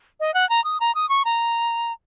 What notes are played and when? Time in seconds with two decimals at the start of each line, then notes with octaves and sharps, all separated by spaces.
0.20 D#5
0.34 F#5
0.49 A#5
0.64 D#6
0.80 A#5
0.95 D#6
1.09 C#6
1.25 A#5